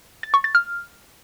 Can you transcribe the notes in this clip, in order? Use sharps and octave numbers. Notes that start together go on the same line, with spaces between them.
A6
C#6
A6
F6